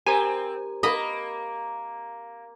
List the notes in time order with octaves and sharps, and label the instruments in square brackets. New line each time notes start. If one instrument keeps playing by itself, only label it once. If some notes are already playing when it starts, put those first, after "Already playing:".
[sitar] C4 [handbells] G4 A#4 A#5 [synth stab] G#5
[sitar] A#3 [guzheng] D#5 B5